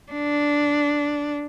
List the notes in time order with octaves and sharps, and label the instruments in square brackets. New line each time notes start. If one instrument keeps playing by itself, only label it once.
[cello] D4